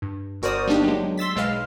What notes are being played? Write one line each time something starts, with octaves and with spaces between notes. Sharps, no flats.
G2
G1 F#4 A#4 C5 D5 D#6
G3 A#3 B3 D4 D#4 G4
F#3 G#3
C6 E6 A6 B6
B1 G#3 B4 F5 F6